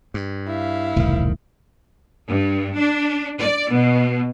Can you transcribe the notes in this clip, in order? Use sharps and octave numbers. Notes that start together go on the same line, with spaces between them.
G2
E4 F5
E1 C2 A2 D#3
G2
D4
D5
B2